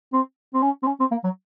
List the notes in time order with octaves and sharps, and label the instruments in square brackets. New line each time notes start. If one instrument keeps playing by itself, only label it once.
[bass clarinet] C4
C4
C#4
C4
C#4
C4
A#3
F#3